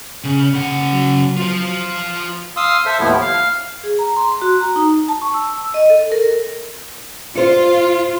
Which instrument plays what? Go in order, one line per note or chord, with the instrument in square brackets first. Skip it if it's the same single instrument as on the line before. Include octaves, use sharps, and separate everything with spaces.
[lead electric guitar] C#3
C#3 F#5
[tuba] F#3
[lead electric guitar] F4 C5
[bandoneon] F5 C6 D#6 E6
A4 C5 E5
D#2 A2 F3 A3 B3 E4
F5
[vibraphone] G#4
A#5
C6
F#4
A#5
D#4
A5
C#6
E6
D#5
A4
A#4
[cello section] F4 [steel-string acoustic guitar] C5